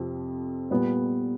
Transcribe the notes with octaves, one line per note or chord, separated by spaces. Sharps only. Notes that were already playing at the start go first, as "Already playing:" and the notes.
Already playing: F2 C3 F3
A#2 G3 B3